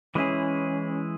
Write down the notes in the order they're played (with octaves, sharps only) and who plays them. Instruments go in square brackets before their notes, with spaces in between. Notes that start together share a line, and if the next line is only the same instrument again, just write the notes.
[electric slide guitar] E3 G#3 E4 G#4 [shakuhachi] C#4